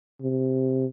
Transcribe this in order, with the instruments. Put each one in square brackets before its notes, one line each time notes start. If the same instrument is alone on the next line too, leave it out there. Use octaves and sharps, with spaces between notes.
[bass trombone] C3